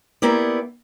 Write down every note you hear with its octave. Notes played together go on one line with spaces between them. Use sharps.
A#3 B3 E4 G4 D5